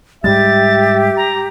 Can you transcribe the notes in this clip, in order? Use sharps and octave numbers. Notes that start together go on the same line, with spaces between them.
G#2 G3 G#3 G4 E5 A6
A#5